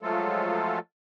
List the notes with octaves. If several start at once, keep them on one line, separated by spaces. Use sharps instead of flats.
F3 F#3 G#3 A3 F4 A4